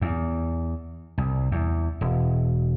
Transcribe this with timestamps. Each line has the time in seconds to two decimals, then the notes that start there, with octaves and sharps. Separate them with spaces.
0.02 E2
1.18 C2
1.51 E2
2.01 E1